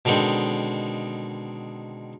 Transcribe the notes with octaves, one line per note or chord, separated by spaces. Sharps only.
B2 D3 D#3 G#3 C4